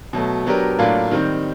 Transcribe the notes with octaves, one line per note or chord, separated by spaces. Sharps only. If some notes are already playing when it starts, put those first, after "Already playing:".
B2 F#3 A3
F#3 B3 D4 G4 A#4
A2 F#3 A#3 D4 F4
D#3 G3 C4 D#4